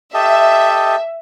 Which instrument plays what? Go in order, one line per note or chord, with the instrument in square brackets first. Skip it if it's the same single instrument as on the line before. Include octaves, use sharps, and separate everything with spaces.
[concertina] G4 A4 D#5 [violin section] E5